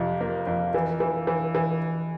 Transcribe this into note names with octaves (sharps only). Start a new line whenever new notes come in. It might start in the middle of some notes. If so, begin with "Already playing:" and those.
Already playing: F2 C3
A#3
F2
E3
E3
E3
E3